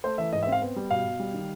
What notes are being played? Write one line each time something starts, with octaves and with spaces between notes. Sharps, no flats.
A3 C5
E3 E5
G#2 D#5
E5
C4
F5
B3
G3
B2 F5
B2
G3
D#3